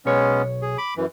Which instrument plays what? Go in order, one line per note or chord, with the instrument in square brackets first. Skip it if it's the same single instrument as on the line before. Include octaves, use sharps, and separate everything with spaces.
[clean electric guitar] B1 C#5 [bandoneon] G#3 B3 C#4
[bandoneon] G#4
B5 D6
F#2 E3